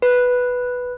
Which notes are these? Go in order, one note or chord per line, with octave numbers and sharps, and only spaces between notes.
B4